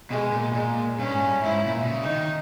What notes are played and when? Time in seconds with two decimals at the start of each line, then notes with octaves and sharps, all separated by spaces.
0.10 B2 G#3
0.32 A#2
0.54 A#2 G#3
0.98 G2 C#4
1.09 G#2
1.20 G2
1.43 G#2 E4
1.66 A#2
1.82 B2
1.88 C#3
2.02 D#4
2.10 D#3